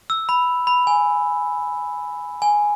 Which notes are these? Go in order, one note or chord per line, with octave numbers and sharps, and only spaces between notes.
E6
B5
B5
G#5
G#5